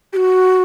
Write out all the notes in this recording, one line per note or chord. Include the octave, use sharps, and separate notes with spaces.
G4
F#4